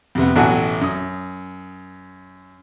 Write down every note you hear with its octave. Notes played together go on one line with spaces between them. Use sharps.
F2 C3 B3
A1 B2 F#3 A4 F#5 G#5
F#2 D#6